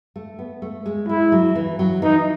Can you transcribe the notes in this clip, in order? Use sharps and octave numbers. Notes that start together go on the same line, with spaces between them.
A3
B3
A3
G#3
G#3 E4
F#3
E3
F#3
E3 D#4